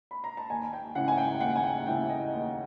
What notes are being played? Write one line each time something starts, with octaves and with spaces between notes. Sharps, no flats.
B5
A#5
A5
D#2 G#5
G5
C#3 E3 A3 F#5
G#5
G5
D#2 F#5
G#5
G5
C#3 E3 A3 G5
D#5
D#2